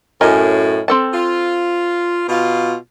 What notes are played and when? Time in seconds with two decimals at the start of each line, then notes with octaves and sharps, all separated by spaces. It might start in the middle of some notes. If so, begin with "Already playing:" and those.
0.21 F#2 A2 A#4 D#5 G#5
0.88 C4 A4 A5
1.14 F4
2.28 B2 F4